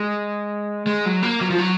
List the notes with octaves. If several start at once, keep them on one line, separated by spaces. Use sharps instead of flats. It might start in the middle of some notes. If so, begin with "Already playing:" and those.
Already playing: G#3
G#3
F#3
A#3
F#3
F3
F#3